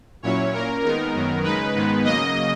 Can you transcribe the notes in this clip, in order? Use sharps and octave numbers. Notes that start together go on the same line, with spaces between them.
A#2 F#3 C#4 E4 C#5
A#2 A#3 C#4 A#4
D#3 G#3 B3 D#4 A#4
F#2 D#3 F#3 B3
C#3 G#3 D#4 B4
G#2 D#3 G#3 B3 D#4
C#3 F#3 A#3 D#5